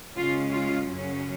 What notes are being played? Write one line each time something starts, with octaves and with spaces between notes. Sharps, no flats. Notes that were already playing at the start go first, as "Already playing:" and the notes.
C#3 G#3 C#4 F4
F4
F#2 C#3 F#3 C#4